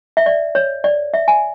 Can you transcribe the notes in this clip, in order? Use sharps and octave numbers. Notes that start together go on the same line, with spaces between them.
E5
D5
C#5
D5
E5
G#5